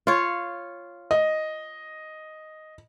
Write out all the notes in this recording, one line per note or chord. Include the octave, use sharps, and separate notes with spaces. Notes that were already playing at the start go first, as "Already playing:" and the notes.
F4 C#5
D#5